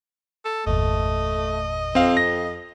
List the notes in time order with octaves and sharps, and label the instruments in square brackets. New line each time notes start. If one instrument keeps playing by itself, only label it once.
[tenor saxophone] A4
[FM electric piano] G1 E2 A#2 [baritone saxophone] A3 [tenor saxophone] D#5
[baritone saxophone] F2 [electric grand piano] C4 F5
[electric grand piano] A#6